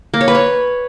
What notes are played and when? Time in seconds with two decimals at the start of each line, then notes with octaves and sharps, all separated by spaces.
0.14 A#3
0.21 C#5
0.28 B4
0.35 C#5